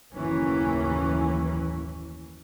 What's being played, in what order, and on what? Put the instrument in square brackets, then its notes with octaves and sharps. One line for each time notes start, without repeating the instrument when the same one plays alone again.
[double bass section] F#1 D#2 A2 E3 A#3 C#4